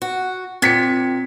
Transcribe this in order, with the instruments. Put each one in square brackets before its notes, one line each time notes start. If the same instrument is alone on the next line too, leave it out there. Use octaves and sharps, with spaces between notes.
[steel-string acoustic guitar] F#4
[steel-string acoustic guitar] A#2 [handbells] C4 [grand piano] G#6 B6 C#7